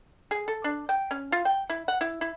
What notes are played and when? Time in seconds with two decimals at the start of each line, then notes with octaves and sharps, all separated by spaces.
0.31 G#4
0.48 A4
0.64 D4
0.89 G5
1.11 C#4
1.32 F4
1.45 G5
1.70 E4
1.88 F#5
2.01 E4
2.21 E4